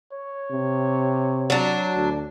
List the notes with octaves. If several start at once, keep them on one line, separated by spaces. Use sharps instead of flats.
C#5
C3
F#3 D4
D2